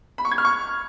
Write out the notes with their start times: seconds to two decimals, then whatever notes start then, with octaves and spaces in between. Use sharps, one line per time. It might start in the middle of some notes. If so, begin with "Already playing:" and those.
0.18 B5
0.25 C#6
0.31 G#6
0.38 F6
0.45 C#6